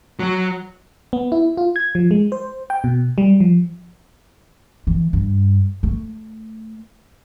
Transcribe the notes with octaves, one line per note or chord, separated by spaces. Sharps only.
F#3
B3
E4
F4
G#6
F3
G#3
C5
G5
B2
G3
F3
E3
G2
A3